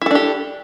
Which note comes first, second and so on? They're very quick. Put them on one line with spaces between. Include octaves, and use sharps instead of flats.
E4 A4 D4 G4